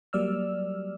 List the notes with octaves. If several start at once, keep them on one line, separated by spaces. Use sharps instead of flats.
F#3 G3 A#3 D5 E6 F6